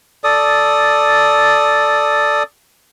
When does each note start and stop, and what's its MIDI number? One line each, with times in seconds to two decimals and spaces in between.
0.24 2.43 69
0.24 2.43 74
0.24 2.43 87